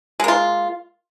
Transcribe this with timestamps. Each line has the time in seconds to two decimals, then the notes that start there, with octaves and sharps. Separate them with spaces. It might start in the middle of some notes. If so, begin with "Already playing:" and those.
0.20 G#3
0.24 A#3
0.28 F4